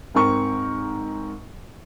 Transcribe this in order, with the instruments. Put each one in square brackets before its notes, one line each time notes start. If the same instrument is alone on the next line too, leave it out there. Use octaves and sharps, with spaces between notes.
[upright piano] G#2 C4 A#4 C#6